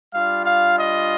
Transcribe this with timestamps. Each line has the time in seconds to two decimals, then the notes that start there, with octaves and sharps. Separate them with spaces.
0.14 G3 D4 F4 F5
0.46 F5
0.78 D#5